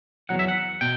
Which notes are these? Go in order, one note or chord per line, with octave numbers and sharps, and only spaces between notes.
E2 C#3 F#3 F#5
E5
F#5
B2 G5